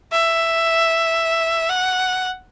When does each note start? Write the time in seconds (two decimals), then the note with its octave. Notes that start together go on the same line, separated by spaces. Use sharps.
0.12 E5
1.70 F#5